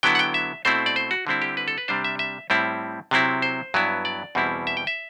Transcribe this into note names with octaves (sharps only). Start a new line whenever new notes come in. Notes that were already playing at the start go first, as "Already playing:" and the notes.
D3 F#3 B3 E4 G5
F#5
G5
E5
B2 A3 C4 E4 C5
D5
C5
F#4
D3 G3 C4 E4
G4
B4
A4
B4
C3 G3 D4 C5
E5
E5
A2 G3 C4 E4
C3 F#3 C4 E4
C5
G2 F#3 B3 E4
D5
E2 B2 G3 C4 E4
E5
G5
E5